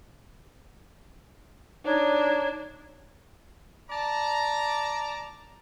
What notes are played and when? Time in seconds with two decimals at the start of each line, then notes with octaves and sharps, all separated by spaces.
1.85 D4 D#4 C#5
3.90 D5 A5 A#5